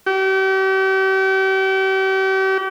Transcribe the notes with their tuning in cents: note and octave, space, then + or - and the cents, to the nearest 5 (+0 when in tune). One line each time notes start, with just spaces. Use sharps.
G4 -40